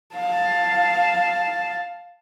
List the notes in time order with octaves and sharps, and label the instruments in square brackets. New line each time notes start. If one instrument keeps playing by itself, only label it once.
[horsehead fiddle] F5 A5